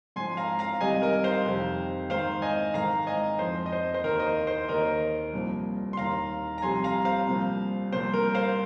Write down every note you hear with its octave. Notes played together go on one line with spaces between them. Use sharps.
G#2 F3 G#5 C6
F5 A#5
F5 A#5
C2 C3 D#3 D#5 G#5
A#4 D#5
C5 F5
F2 C3 D#3
G#2 D#3 C5 F5
D#5 G#5
G#2 D#3 F5 A#5
D#5 G#5
F2 F3 C5
D#5
C5
C5
D#2 D#3 A#4
D#5
C5
C5
D#2 D#3 A#4 D#5
C2 A#2 F3
C6
D#2 D#3 F5 A#5
A#5
C2 C3 F3 G#5 C6
F5 A#5
C5 F5
C2 A#2 F3
C2 A#2 F3 C5
A#4
C5 F5